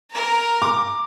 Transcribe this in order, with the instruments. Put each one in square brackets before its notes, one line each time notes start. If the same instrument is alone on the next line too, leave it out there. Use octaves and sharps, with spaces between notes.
[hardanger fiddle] A#4 A#5
[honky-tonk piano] D6